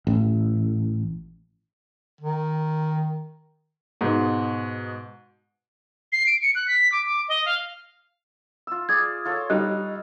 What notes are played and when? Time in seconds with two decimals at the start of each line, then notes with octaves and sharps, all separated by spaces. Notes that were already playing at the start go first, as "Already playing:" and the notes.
0.07 A1
2.21 D#3
4.01 G#2 B2 D#4
6.13 C7
6.27 D7
6.42 C#7
6.55 F#6
6.68 B6
6.92 D6
7.06 D6
7.28 D#5
7.46 F5
8.67 F4 E6
8.89 G#4 D5 G#6
9.25 F4 A4 C#5
9.50 G3 D#4 D#5 F#6